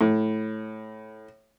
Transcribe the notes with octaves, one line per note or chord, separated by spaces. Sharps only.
A2